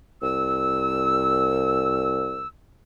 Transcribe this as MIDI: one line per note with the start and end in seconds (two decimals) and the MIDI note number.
0.22 2.48 36
0.22 2.48 88